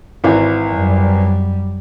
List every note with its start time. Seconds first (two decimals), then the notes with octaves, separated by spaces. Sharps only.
0.24 G#1 E3
0.70 F#2 G3